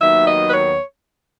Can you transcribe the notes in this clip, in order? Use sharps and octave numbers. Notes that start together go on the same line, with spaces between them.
D#2 D#3 F#3 B3 E5
D#5
B4
C#5